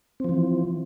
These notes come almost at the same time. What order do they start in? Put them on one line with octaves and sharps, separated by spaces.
C4 F3 E3